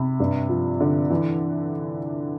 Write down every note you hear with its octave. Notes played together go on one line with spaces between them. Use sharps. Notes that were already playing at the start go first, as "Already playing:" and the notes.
Already playing: C3 B5
G2
F3
D3
E3